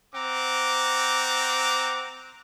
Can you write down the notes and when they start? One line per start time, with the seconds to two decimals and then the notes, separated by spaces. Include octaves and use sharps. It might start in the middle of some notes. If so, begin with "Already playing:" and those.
0.15 C4 F#5 A#5 D6